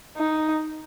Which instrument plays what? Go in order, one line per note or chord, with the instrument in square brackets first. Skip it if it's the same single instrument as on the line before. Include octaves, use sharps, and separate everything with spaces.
[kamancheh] D#4